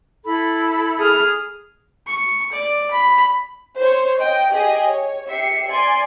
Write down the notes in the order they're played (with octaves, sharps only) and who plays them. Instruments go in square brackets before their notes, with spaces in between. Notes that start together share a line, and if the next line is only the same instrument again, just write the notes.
[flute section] E4 A4 B5
[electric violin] G#4 F6
[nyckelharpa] C#6
D5
B5
[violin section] C5 C#5
D#5 G5
G4 G#4 D#5
C#5
G4 E5 C7 C#7
D5 G#5 C6